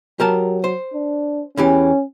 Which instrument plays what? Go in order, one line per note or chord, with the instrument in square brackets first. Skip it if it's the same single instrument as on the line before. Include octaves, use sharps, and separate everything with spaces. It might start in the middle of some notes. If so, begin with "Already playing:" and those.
[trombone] F#3 [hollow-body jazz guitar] G4 A#4 A5
[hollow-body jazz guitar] C5
[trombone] D4
[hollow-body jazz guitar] E2 E3 G4 [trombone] C#4